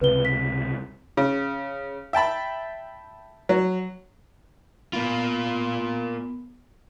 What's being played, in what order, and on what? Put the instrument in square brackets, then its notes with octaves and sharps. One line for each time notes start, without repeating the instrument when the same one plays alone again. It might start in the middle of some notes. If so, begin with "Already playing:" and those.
[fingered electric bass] C#2 C3 [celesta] B4 G7
[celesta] B6
[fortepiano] C#3
E5 G5 A5 B5
F#3
[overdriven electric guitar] A#3 F4 [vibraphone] B3